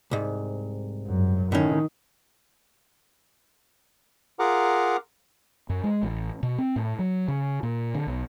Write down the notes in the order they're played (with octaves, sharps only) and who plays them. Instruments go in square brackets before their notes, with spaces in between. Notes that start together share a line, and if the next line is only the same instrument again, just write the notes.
[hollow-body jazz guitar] C2 G#2
[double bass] F#2
[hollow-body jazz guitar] A2 C#4 [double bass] D#3
[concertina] F4 G#4 A#4 F#5 A#5 D6
[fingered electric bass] F#2
G#3
A1
B2
C4
A2
F#3
C#3
A#2
D3
B1